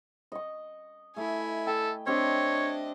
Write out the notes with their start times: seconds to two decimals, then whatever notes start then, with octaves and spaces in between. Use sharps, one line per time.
0.32 D#5 C#6
1.16 A3 E4 G#5
1.67 A4 G5
2.07 C4 D4 G4 C#5 D#5